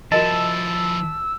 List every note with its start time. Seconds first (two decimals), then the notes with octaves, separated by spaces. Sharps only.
0.12 F3 E4 F#4 A#4 D#5 A5 E6